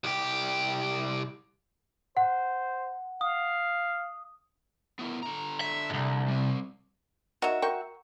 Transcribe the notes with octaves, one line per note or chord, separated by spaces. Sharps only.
C2 G4
C5 F#5
F5 D#6
B3 E4 A#4
D3 A#5
E5
C2 G#2
G3 C4
D#4 F#4 A#4 C#5 E5
A#4 G5 C#6